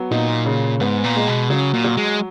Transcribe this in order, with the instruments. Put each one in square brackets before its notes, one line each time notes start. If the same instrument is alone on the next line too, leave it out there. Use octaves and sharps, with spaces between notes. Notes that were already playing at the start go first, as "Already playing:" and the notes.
Already playing: [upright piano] F#3 B3
[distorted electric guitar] A#2 [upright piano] D#4
[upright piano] C#3
[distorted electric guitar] G#2 [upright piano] B3
[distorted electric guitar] A#2
[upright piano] G#3
[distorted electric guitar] B2
[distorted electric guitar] C#3 [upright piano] F#3
[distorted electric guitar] A#2
[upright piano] F#3
[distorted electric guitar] G#3